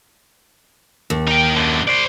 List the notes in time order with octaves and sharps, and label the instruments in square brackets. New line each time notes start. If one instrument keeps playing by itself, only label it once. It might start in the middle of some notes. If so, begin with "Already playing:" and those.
[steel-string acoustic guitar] D#2
[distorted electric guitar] D#4 G5
F#2 D3
C5 D5